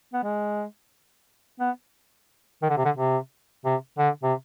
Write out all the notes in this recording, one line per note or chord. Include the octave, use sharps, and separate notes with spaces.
B3
G#3
B3
D#3
D3
C3
D3
C3
C3
D3
C3